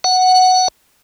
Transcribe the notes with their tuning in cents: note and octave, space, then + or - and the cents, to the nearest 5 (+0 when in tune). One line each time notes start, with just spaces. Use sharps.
F#5 +0